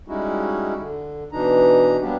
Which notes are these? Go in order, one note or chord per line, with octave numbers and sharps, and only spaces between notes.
G3 G#3 C#4 D#4 E4 F#4
D3
B2 E3 D4 D#4 A#5
F#3 G3 A#3 B3 D4 G4